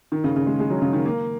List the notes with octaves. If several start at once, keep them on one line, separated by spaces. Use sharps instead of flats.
D#3
C#3
C#3
G#3
G#3
F#3
C#3
D#3
A#3